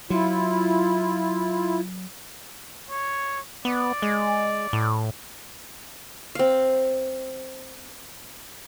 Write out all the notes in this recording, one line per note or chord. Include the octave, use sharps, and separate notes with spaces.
F#3 E4 F4
C#5
B3 D5
G#3
A2
C4 F5